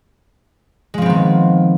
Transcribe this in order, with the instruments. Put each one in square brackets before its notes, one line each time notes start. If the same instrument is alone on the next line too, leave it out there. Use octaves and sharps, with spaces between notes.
[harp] G#3
F3
C4
B3
D#3